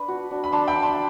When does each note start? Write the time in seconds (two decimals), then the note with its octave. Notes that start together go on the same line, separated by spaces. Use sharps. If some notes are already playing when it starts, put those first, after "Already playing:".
Already playing: D4 B4
0.08 F#4
0.31 D4
0.44 B5
0.52 D4 A5 C6
0.68 G5 B5
0.76 D4
0.82 A5 C6